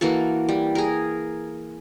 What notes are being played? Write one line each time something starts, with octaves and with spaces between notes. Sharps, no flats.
E3 A#3 F#4 A4
G3
G#4 A#4